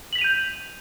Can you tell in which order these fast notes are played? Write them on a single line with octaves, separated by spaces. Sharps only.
F#7 B6 F7 D#7 G6